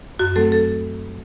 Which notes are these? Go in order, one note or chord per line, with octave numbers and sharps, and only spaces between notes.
F#2 F#4
F#3 A3 C4 A4
A4